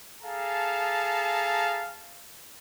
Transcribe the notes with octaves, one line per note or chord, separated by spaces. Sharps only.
G#4 A4 F5 A5 A#5